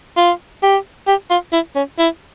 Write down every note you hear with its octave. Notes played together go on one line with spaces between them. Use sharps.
F4
G4
G4
F4
E4
C#4
E4